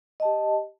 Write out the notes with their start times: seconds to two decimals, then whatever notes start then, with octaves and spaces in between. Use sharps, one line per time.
0.20 D#5
0.22 A5
0.25 G4